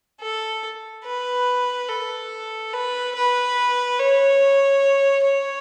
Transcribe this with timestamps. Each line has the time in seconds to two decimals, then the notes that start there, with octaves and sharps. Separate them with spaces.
0.21 A4
1.05 B4
1.89 A4
2.73 B4
3.15 B4
3.99 C#5
5.25 C#5